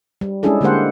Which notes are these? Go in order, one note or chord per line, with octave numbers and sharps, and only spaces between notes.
G3
G#3 C#4 D4 E4 G#4 A4
D3 G#3 A#3 G4 C5 F#5